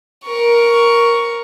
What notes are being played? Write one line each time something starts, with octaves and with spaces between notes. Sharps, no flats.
A#4 C#6